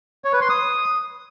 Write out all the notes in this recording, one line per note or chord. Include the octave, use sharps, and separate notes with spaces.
C#5
B4
C6
D#6